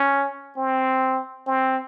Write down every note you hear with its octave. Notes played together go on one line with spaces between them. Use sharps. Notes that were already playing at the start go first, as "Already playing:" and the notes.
Already playing: C#4
C4
C4